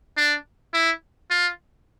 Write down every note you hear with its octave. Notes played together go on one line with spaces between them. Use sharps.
D4
E4
F4